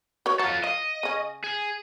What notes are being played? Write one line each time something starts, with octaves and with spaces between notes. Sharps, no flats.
F#4 B4 C#5
F#3 F4 A4
D#5 F5
C#3 C#4
G#4